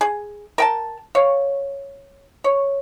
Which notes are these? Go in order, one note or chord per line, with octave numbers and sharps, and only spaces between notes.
G#4
A#4 G5 A5
C#5 F5
C#5